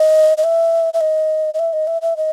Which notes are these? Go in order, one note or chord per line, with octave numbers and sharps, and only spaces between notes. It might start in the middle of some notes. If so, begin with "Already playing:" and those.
Already playing: D#5
D#5
E5
E5
D#5
D#5
E5
D#5
E5
E5
D#5